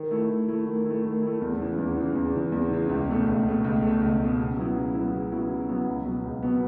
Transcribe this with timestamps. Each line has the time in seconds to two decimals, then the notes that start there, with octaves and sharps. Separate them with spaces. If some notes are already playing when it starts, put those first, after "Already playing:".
Already playing: D#3
0.11 A3 E4
0.29 D#3
0.48 A3 E4
0.67 D#3
0.85 A3 E4
1.04 D#3
1.22 A3 E4
1.41 E2
1.60 C#3 E3
1.78 E2
1.96 C#3 E3
2.15 E2
2.33 C#3 E3
2.52 E2
2.71 C#3 E3
2.90 C#2
3.08 B2 A3
3.26 C#2
3.45 B2 A3
3.64 C#2
3.82 B2 A3
4.02 C#2
4.19 B2 A3
4.38 C#3
4.56 F#3 B3 E4
4.76 C#3
4.94 F#3 B3 E4
5.13 C#3
5.32 F#3 B3 E4
5.50 C#3
5.68 F#3 B3 E4
5.87 C#2
6.05 B2 F#3 B3
6.24 C#2
6.43 B2 F#3 B3